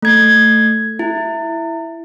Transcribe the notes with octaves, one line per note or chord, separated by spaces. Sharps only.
A3 G#6
E4